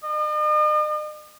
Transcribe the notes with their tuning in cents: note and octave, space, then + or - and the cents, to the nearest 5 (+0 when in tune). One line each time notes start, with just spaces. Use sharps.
D#5 -45